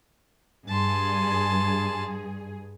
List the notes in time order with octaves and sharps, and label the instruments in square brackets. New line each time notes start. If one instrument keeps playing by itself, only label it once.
[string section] G2 G#4 [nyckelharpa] A5 C6